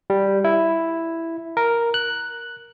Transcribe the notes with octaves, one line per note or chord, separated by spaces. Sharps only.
G3
E4
A#4
F#6